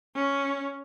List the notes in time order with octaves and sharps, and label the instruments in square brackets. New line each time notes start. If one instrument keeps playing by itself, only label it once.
[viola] C#4